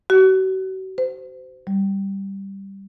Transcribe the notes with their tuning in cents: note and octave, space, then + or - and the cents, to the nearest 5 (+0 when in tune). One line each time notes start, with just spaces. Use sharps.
F#4 +40
C5 -30
G3 +0